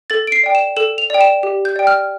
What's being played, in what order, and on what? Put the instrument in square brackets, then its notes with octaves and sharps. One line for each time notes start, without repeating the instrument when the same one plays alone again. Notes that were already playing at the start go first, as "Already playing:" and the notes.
[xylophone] A4 A6
D7
C7
D5 G5
E7
A4 E7
F7
D5 G5
E7
G4
G6
D5 G5
F6